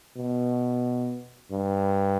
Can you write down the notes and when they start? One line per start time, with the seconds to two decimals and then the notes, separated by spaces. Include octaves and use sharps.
0.17 B2
1.52 G2